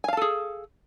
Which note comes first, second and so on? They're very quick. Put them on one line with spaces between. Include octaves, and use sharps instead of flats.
G#5 F5 A5 A4 G#4